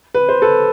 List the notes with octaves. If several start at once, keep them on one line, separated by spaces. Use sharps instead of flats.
B4
C5
A4 B4